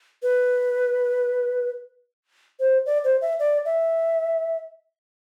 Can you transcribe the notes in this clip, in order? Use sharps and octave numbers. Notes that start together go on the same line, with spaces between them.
B4
C5
D5
C5
E5
D5
E5